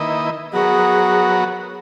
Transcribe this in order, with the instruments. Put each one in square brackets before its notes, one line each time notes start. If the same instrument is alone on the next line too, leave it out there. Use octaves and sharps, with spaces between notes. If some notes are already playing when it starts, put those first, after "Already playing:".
Already playing: [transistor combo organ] D#3 A#3 E4 B4 D#5
[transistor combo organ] F#3 B3 F#4 A#4 C#5 [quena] G#4